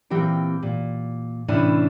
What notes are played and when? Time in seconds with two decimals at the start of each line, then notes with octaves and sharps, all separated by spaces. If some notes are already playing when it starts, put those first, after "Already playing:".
0.10 A#2 E3 C4 G4 G5
0.63 A#2
1.48 A2 C3 E3 C#4 D4 E4